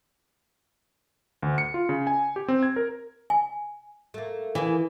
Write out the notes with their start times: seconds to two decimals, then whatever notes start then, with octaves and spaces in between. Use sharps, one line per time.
1.43 D2
1.58 C#7
1.74 F4
1.89 C#3
2.07 G#5
2.36 G4
2.48 C4
2.63 G#6
2.76 A#4
3.30 G#5
4.14 A3 A#3
4.55 E3 A#3 G#4